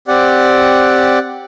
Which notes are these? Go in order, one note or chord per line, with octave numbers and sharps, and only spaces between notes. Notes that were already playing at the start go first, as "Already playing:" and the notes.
C4 G4 D5 F#5